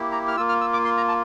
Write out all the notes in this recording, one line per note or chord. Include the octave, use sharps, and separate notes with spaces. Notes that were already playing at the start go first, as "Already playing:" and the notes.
Already playing: A#3 E4 G4
A#5
F6
A#3 F4 E6
F6
E6
D6
C6
A#5
A5